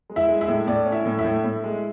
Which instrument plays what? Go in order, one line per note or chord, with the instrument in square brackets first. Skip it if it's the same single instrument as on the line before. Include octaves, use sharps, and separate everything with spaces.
[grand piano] G#3
[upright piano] E4 E5
[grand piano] G#3
[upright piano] E4 E5
[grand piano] A2
[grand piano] A2 [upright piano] D5
[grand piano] C#4
[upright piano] E4 E5
[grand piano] A2
[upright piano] E4 E5
[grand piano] A2
A2
G#3